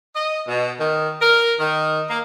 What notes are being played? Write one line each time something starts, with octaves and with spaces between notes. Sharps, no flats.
D#5
B2
D#3
A#4
D#3
A#3